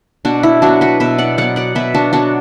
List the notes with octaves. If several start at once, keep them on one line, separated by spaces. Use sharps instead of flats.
B2 D4 F#4
E4
F#3 B3 D4 F#4
F#4 B4
B2 B4 E5
D5 F#5
F#3 B3 D5 F#5
D5 F#5
B2 B4 E5
D4 F#4
F#3 B3 D4 F#4